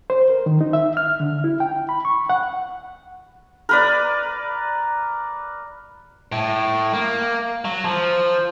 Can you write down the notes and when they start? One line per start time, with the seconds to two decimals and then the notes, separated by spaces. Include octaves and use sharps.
0.10 C5
0.30 A#4
0.46 D#3
0.61 D#4
0.73 E5
0.97 F6
1.20 D3
1.44 E4
1.60 G5
1.89 B5
2.05 C#6
2.30 F#5
3.69 A#4 B4 D5
6.32 A2
6.93 A#3
7.65 F#3
7.85 F3